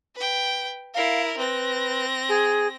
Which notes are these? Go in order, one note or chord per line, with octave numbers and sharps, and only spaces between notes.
B4 G5
E4 A#4 F5
C4 B4 A#6
G#4